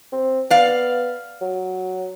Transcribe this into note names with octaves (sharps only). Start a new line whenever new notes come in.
C4
B3 D5 F5
F#3